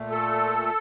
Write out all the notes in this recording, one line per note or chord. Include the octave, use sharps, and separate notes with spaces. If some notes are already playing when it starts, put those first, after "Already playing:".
Already playing: A#2 A3
A4